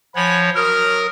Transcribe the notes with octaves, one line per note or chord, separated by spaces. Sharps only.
F3 C#5 F#5 G#5 B5
F#3 A#4 D#6 F6